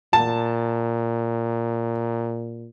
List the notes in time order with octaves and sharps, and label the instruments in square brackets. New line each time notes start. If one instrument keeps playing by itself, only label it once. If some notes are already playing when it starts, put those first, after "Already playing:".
[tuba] A#2 [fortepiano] A5